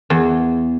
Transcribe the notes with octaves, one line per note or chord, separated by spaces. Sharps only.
E2